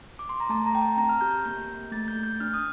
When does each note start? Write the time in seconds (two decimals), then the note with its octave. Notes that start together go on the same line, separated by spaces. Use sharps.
0.19 D6
0.29 C6
0.40 A#5
0.49 A3 A5
0.66 A#5
0.73 A3 G5
0.82 A5
0.97 C4 A#5
1.09 F6
1.21 G4 G6
1.45 A#3 G6
1.68 A#3
1.92 A3 A6
2.08 G6
2.16 A3
2.23 G6
2.40 D4 F6
2.54 D#6